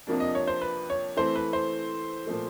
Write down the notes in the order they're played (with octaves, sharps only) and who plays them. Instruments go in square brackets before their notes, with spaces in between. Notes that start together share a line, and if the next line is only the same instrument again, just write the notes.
[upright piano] F2 C3 F3 A#3 D4
[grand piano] D#5
C#5
C5
B4
C#5
[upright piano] E3 A3 C4 [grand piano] C5
[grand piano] B4
C5
[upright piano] A#2 F3 A3